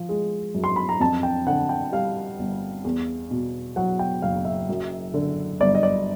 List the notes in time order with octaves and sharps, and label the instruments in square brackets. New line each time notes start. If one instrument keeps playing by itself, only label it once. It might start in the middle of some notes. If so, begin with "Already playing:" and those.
Already playing: [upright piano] F3
G#3
F#2
C6
B5
A#5
F2 A5
G5
D3 F#5
G5
G3 F5
G1
E2
B2
F#3 F#5
G5
F#1 F5
E5
F#2
D3
G1 D5
D#5
D5